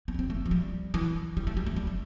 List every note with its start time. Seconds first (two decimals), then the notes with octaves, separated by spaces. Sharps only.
0.08 B3
0.14 D4
0.19 C4
0.30 A3
0.46 F3
0.51 G3
0.94 E3
1.37 G3
1.47 A3
1.57 G3
1.67 A3
1.76 G3
1.87 A3